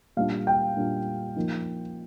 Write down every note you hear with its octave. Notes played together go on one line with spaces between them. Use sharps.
A#2 G3 D4 F5
G5
A#2 G3 D4
F3 A#3 D#4